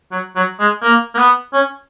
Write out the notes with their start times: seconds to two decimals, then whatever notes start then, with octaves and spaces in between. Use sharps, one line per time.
0.12 F#3
0.36 F#3
0.59 G#3
0.82 A#3
1.14 A#3
1.18 B3
1.53 C#4